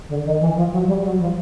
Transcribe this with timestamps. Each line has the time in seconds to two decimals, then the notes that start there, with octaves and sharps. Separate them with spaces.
0.09 D3
0.24 D#3
0.40 E3
0.56 F3
0.72 F#3
0.87 G3
1.03 F#3
1.19 F3